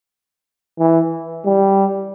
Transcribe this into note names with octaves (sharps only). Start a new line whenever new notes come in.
E3
G3